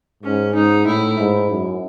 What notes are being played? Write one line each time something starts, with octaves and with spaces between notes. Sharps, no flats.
G#2 C#4
G#2 D#4
A2 E4
G#2
F#2